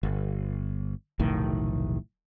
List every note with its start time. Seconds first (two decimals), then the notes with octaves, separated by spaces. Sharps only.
0.03 G1
1.19 F1 B1 A2 D#3